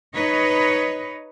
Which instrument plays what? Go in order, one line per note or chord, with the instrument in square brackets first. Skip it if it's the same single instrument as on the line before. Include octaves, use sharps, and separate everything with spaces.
[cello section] D#4 B4 C#5 D#5